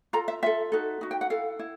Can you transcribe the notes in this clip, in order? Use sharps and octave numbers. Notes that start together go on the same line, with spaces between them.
F4 A4 A#5
E5
F4 A4 E5
D#4 F#4 A4
D#4 F#4
G5
F#5
E4 A4 F5
E4